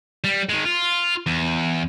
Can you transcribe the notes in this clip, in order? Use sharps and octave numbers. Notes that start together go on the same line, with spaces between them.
G3
D#3 G#3
F4
E2